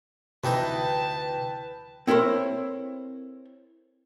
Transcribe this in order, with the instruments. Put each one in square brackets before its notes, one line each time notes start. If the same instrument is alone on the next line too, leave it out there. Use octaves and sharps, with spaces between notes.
[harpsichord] D2 E3 D#4 [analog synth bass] C3 [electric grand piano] B4 G5 [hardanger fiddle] A5
[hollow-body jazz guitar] C4 E4 A4 A#4 C5 C#5